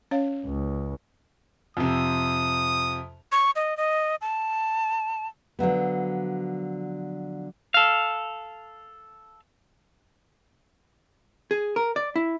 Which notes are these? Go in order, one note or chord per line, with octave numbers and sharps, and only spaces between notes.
C#4 C#5 F5
C#2
F2 C3 D#6
C#6
D#5
D#5
A5
D3 F3 F#3 B3
A4 F5
G#4
A#4
D5
E4